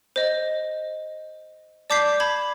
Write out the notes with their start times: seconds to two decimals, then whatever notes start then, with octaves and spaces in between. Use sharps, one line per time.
0.16 C5 D#5
1.90 D5 A5 D6 G6 B6 C7
2.20 A5 B5 G#6